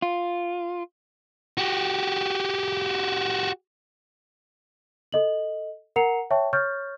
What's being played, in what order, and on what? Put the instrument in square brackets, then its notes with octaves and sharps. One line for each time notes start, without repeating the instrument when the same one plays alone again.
[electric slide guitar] F4
[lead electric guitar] F#4 G4
[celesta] A4 D#5 F#7
A#4 F#5 A#5 C7 C#7 F7
C#5 E5 G5 A5 C#6
C#5 C#6 F6 G6 A6